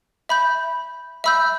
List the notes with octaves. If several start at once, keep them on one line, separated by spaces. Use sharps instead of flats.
E5 B5 G6
E5 B5 E6 G6